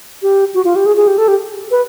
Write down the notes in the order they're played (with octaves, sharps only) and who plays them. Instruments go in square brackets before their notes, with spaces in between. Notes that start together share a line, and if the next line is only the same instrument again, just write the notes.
[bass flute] G4
F#4
F4
G4
G#4
G#4
G4
A4
G4
B4